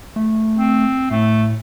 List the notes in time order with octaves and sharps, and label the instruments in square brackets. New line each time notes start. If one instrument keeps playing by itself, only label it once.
[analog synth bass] A3
[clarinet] C4
[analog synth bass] A2 [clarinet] A3